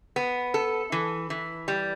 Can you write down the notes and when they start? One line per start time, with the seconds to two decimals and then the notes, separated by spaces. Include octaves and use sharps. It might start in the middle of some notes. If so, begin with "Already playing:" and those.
0.16 B3
0.54 A4
0.92 E3
1.30 E3
1.68 G3